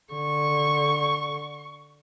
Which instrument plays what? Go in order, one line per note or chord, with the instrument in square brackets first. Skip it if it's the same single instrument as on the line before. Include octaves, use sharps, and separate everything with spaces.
[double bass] D3 [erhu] C#6